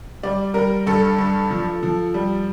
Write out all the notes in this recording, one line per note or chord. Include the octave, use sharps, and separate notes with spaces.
G3 D5
G3 A#4
G2 A4
G2
F3
F3
G3